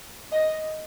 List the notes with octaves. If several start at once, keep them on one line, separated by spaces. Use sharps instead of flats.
D#5